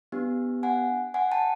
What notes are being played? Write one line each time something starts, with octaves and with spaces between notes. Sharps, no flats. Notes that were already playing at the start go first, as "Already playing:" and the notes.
B3 D4 G4
F#5 G#5
F#5 G#5
G5 A5